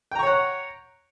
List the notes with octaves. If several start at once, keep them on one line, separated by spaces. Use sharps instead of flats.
C#5 F#5 G5 A#5 C#6